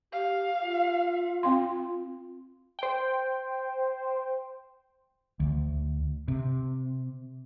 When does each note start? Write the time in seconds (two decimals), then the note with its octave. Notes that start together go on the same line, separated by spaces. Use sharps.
0.13 G4 F5
0.61 F4
1.43 C4 F5 C6
2.79 C5 G5
5.40 D2
6.28 C3